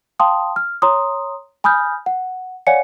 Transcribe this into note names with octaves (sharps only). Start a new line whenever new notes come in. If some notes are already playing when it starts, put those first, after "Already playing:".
F5 G5 A5 C6 D#6
F6
C#5 A#5 C6 D#6
G#5 B5 D#6 F6 G6
F#5
C#5 D5 F5 F#5 G#5 C#7